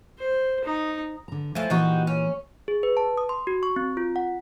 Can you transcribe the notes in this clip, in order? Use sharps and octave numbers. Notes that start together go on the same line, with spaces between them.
C5
D#4
D3 A#5
E3 F3 A3
A#2 E3 A#3 D#4 F#4 G4
C#4
G#4
B4
A5
D#6
C6
F#4
C#6
C4
F4
F#5